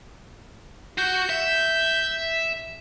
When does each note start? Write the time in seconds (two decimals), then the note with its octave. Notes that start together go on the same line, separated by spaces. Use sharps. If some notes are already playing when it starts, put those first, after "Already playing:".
0.98 F#4 G6
1.30 E5